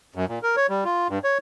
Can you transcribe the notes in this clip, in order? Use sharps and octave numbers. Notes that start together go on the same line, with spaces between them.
F#2
A#2
A#4
C#5
G3
F4
G2
C#5